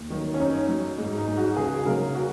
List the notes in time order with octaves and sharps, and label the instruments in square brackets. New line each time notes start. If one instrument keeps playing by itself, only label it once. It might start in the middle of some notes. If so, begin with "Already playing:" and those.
Already playing: [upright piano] D#2
D#3 F#3
C#4
F#2 D#4
F#3
G#2
D#4
G#3
F#4
C#2 G#4
C#3 F#3 A#4
F#4